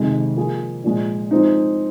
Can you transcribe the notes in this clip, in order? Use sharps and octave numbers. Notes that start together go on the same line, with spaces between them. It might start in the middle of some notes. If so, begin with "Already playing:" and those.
Already playing: F2 C3 D#3 G#3
F3 A#3 F4 G#4
A#2 F3 G#3
F3 G#3 C4 D#4